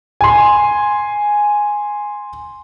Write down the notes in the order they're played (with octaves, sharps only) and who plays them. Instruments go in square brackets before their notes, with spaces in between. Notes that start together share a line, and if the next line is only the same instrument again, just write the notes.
[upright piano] G#5 C6